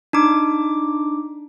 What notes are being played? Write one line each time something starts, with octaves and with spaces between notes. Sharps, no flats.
D4 D#4 D6